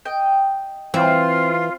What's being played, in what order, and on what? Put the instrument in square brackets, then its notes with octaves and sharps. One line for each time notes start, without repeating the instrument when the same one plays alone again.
[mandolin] D#5 G5
[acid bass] E3 [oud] C4 [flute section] F4